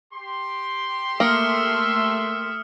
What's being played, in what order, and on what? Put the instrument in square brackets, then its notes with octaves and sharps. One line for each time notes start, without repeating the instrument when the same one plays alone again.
[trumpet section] G4 C6
[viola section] A3 E5 [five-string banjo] A#3 [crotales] D#6 F6 C#7